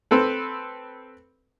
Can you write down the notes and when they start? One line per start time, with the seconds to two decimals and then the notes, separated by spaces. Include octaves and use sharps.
0.11 C4 A4 B4